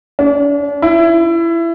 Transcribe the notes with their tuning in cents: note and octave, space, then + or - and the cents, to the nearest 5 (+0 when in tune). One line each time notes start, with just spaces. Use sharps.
D4 -40
E4 +25